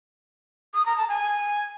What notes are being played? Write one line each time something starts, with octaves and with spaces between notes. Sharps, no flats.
D#6
A#5
A5
G#5